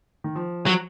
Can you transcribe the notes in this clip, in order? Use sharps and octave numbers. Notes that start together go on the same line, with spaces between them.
D#3
F3
F#3